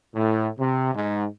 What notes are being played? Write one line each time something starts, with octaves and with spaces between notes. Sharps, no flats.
A2
C3
G#2